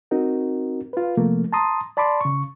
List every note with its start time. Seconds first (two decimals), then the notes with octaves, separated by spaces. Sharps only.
0.11 C4 D#4 F#4 A#4
0.93 F4 B4
1.17 C3 F3 A3 A#3
1.53 A5 A#5 C6 D#6
1.97 D5 A5 B5 C6 D6
2.21 C#3 C#6